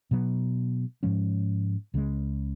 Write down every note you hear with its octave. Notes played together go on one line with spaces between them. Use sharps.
B2 F#3 B3
G#2 F3 G#3 C#4
C#2 C#3 F3 G#3